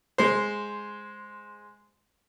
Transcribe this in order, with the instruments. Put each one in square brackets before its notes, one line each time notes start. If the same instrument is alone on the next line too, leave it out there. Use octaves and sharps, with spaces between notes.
[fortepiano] G#3 C5